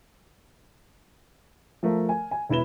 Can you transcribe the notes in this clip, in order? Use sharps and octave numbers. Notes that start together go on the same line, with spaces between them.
F3 A3 A#4
G#5
G#5
E1 E4 B4 E7 G7